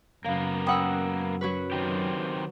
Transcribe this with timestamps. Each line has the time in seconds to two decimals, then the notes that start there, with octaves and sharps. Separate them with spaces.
0.25 F#2 C#3 A#3 B3 F5
0.67 C#4 F#5 G5 B5 D#6 E6
1.41 F#3 F#4 B4
1.72 D#3 C4 G4